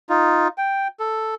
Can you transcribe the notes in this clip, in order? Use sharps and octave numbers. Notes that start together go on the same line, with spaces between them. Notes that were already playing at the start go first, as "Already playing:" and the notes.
D#4 F4
G5
A4